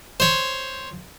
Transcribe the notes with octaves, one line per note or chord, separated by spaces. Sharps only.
C5 C#5